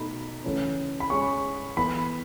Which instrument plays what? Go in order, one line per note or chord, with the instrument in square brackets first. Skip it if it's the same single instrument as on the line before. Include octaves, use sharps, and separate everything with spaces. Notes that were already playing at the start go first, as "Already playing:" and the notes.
Already playing: [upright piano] B2 A3 D#4 [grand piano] B5
[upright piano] C#3 E3 A3 C#4
[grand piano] B5
[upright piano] G#3 C#4 G#4 [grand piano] C#6
[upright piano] E3 B3 E4 A4 [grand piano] B5